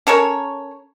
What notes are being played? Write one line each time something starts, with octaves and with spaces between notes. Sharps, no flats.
C#4 A4 A#4 C#5